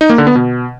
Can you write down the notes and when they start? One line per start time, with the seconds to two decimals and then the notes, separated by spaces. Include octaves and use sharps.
0.01 D#4
0.09 A#3
0.18 D3
0.27 B3
0.35 B2